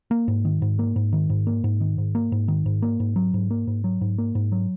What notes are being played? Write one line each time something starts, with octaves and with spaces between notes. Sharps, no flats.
A#3
G#2
D#3
G#2
A#3
G#2
D#3
G#2
A#3
G#2
D#3
G#2
A#3
G#2
D#3
G#2
A#3
G#2
F#3
G#2
A#3
G#2
F#3
G#2
A#3
G#2
F#3